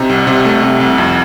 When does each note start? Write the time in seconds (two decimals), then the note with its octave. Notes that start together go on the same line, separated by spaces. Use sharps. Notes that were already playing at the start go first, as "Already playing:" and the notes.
Already playing: C3 D#4
0.09 C2
0.27 C3
0.45 A3
0.62 C3
0.80 C2
0.98 F2